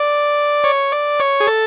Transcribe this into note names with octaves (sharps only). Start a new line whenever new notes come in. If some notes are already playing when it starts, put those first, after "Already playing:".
Already playing: D5
C#5
D5
C#5
G#4
A4